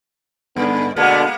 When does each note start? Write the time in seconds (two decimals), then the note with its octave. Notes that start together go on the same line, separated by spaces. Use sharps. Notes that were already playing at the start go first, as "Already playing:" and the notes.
0.56 G2 D3 B3
0.96 B2 D3 G#3 A#3 B3